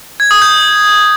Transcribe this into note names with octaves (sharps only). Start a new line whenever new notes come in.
G#6
D#6
G6